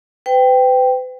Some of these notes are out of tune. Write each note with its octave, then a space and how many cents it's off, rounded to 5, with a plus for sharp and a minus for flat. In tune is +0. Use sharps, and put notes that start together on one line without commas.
B4 +40 G5 +0